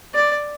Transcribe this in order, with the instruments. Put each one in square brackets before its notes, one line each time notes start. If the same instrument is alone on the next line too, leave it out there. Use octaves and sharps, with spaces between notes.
[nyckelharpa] D5